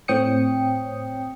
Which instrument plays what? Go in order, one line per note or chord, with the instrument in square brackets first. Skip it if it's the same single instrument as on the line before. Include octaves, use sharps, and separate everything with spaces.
[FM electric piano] A2 C4 C#5 G5 D#6 C#7